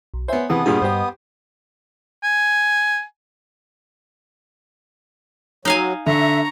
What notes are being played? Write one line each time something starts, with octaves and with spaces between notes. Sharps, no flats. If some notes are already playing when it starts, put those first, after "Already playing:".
B1
B3 C5 C#5 E5 G#5
C3 E3 B3 G#4 A5 D#6
G2 A#2 G4 G#4 D5
G2 G3 G4 C5 D#5
G#5
F#3 D#4 F5 G#5
D3 E5 A#5 C#6